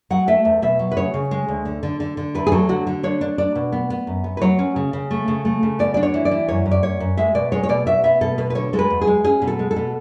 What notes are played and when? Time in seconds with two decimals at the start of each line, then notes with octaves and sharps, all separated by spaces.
0.10 F#3 F#5
0.27 A3 E5
0.45 E2
0.62 B2 E5
0.79 F#3
0.92 B4
0.97 C#3 C#5
1.14 C#3
1.31 G#3
1.48 D2
1.65 D3
1.83 D3
2.00 D3
2.17 D3
2.35 E2 B4
2.47 G#4
2.52 F#3 A4
2.69 D3 F#4
2.87 D3
3.03 D4 C#5
3.21 D4
3.38 D4 D5
3.55 B2
3.72 B3
3.90 B3
4.07 F#2
4.24 B3
4.37 B4
4.41 F#3 C#5
4.59 C#4
4.76 C#3
4.93 C#3
5.11 A3
5.28 C#3
5.45 A3
5.63 C#3
5.79 B3 D5
5.94 D4 D5
6.03 C#5
6.14 E3
6.25 D5
6.31 E3
6.48 F#2 C#5
6.66 F#2
6.71 D5
6.83 F#2 C#5
7.00 F#2
7.17 G#3 E5
7.35 B2 D5
7.52 G#3 C#5
7.63 C#5
7.69 B2 D5
7.86 B2 E5
8.04 B3 E5
8.21 B2 A4
8.38 B2 B4
8.50 B4
8.55 D3 C#5
8.73 G#3 A4
8.79 B4
8.90 E2
9.01 G#4
9.07 G#3
9.24 C#4 G#4
9.42 B2
9.47 A4
9.59 G#3
9.71 A4
9.76 B2